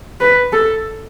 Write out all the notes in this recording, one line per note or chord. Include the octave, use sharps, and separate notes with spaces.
B4
A4